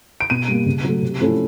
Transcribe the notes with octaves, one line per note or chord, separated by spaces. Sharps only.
D7
B2 D#7
G3 A#3
C#3
F#3 A3
C3
F3 A3 C#4 E4